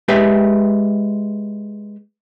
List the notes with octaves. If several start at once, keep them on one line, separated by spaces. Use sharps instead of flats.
G#3 G4 B4 E5